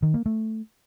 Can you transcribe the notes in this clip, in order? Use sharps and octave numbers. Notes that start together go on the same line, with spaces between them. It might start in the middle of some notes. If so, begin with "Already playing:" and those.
D#3
A#3
A3